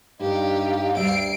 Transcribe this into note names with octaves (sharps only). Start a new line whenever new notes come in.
G2 D#4 G4 F5
D2 G3 E5 C7 D7